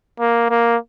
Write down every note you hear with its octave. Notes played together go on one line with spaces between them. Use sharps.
A#3
A#3